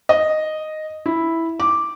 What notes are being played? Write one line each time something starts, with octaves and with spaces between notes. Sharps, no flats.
D#5
E4
D6